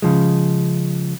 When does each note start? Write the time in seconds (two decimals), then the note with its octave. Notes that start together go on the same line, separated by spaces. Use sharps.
0.02 C#3 F3 G#3